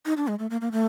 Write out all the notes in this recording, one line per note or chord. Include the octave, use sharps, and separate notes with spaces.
D#4
D4
G#3
A3
A#3
A#3
A3